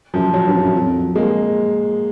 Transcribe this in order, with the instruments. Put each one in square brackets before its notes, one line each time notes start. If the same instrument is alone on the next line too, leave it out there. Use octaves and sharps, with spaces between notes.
[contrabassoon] F#2 [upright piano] F3
[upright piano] F#3
[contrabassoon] G2
F2
F#2
F2
[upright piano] G#3 A#3